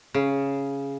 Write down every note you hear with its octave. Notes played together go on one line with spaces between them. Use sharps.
C#3